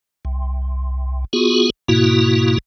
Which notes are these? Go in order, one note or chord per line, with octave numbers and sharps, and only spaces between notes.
C2
B3 F4 F#4 G#4
G#2 B2 A#3 E4 F#4